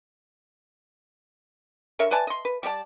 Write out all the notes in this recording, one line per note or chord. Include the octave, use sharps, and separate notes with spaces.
D3 A#4 C#5 E5
B4 D5 G#5 A5
D#5 C6
B4
G3 G4 D5 A5